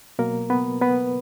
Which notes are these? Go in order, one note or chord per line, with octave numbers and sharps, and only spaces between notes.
B2 F#3 A#3 A#4
B3 B4
B3 B4